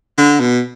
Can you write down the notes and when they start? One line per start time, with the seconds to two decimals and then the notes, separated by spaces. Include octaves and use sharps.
0.18 D3
0.40 B2